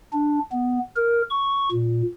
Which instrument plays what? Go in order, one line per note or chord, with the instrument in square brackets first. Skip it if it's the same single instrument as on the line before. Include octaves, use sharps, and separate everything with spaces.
[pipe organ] D4
B3
A#4
C#6
A#2